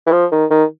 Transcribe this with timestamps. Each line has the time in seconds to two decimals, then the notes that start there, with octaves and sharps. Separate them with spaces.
0.07 E3
0.12 F3
0.32 D#3
0.51 D#3